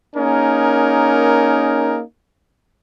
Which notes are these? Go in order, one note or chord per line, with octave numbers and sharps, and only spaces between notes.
A#3 C#4 D#4 G#4 A#4